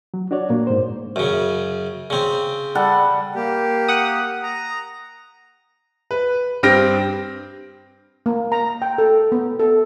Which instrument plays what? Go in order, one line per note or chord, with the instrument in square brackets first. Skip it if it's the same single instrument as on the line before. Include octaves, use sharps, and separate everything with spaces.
[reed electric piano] F#3
D4 F#4 C#5 D5
A#2 A#3
G#2 C5
[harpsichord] F#2 C#3
C#3 C4
[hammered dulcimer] G3 A4 F#5
[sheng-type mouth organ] A#3 G4
[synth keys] F#5 D#6
[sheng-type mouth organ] A#5
[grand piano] B4
G2 C4 G4 F6 A#6 D7
[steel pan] A#3
A#5
G5
A4
B3
A4